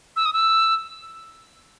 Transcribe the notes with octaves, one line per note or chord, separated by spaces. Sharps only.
E6
D#6
E6